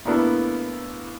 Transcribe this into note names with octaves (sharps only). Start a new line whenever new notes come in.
A2 A#3 B3 D4 E4